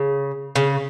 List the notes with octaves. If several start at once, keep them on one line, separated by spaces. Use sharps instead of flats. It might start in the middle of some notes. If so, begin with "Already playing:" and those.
Already playing: C#3
C#3